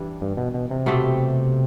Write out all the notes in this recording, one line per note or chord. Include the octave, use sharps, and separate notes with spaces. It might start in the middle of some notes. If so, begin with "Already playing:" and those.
Already playing: E3 G3 D4
G2
B2
B2
C3
B2 A3 C4 G4